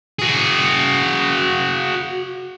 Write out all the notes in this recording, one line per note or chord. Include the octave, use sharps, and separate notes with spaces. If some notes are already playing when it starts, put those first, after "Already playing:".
F#4 G#4